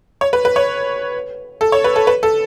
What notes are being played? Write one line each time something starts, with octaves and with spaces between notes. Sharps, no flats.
C#5
B4
B4
C#5
A4
C#5
B4
A4
B4
A4